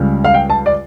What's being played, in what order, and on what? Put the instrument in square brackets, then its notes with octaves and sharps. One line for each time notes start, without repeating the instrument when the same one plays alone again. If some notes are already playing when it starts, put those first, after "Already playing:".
Already playing: [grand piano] C#2 C#3 G3
F5
G5
A5
D5